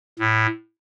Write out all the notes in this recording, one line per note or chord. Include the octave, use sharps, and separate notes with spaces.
A2